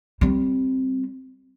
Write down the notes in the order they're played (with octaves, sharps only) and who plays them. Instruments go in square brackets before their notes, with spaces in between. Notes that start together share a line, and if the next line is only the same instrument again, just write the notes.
[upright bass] G3 C4